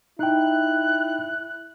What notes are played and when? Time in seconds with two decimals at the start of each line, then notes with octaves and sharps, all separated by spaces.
0.19 D#4 E4 G5 F#6